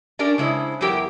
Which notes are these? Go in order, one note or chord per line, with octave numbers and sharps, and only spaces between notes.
C#4 D4 G4 A#4 D5
C#3 G#3 E4 C5
E2 F#3 E4 G4 A#4 G5